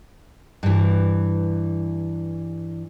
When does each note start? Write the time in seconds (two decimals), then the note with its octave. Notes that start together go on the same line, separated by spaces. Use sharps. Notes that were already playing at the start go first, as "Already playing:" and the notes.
0.63 G2 E3